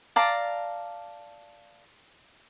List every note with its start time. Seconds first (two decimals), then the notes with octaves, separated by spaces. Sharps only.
0.16 D5 F5 A5 A#5